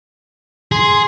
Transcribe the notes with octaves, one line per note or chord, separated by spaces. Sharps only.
G#4 C6